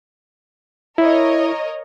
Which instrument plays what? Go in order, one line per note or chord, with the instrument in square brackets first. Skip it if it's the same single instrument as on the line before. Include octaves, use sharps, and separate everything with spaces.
[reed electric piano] E4 [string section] A#4 C#5 D#5